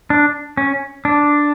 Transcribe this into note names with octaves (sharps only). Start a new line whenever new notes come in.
D4
C#4
D4